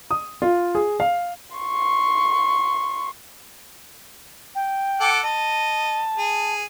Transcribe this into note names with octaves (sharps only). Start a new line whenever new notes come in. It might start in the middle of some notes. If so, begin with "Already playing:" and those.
D#6
F4
G#4
F5
C6 C#6
G5
A4 F#5 D6
D#5 A5
G#4